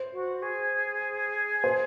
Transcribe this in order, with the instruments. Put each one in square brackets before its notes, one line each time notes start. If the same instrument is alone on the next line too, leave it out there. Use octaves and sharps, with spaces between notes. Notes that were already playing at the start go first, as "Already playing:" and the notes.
Already playing: [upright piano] C5
[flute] F#4
G#4
[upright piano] C5